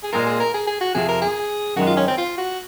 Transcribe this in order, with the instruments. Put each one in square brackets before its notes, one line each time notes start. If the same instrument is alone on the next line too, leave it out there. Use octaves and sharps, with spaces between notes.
[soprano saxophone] G#4
[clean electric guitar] A#2 G#3 C4 F4 [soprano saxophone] A#4
[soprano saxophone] G#4
A#4
G#4
G#4
F#4
[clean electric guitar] F2 C3 F3 C4 [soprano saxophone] G#4
[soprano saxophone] A#4
G#4
[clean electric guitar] F#2 D#3 G#3 [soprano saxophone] F#4
[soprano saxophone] F4
C#4
C4
F4
F#4